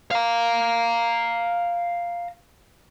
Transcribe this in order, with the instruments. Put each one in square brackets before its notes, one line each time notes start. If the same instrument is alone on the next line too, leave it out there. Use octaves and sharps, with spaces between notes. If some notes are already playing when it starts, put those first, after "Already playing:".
[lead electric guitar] F5 A#5